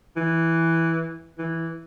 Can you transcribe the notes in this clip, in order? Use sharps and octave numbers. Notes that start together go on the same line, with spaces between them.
E3
E3